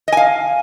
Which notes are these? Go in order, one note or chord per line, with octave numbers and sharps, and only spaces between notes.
D#5 F5 G#5